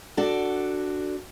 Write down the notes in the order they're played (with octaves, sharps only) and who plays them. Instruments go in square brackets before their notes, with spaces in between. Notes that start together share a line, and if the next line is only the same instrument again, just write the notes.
[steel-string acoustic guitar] D4 F#4 A4